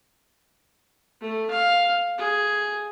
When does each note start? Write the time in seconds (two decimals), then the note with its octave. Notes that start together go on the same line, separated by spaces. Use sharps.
1.21 A3
1.50 F5
2.18 G#4